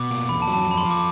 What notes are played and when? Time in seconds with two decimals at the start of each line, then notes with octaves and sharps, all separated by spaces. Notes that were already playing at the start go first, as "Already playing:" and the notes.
Already playing: B2 D6
0.11 A#3
0.28 E2 B5
0.42 A5
0.48 F#3
0.53 A5
0.66 F2 B5
0.78 C6
0.85 F3
0.91 D6